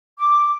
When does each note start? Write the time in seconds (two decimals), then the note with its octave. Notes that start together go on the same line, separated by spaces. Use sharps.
0.19 D6